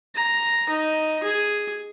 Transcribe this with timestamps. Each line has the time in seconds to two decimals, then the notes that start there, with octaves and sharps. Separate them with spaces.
0.15 A#5
0.70 D#4
1.23 G#4